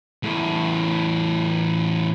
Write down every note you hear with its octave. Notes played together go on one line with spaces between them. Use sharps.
E2 A2